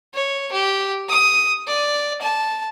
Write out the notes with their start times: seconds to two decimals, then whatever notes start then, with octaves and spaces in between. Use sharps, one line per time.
0.14 C#5
0.52 G4
1.09 D#6
1.68 D5
2.22 A5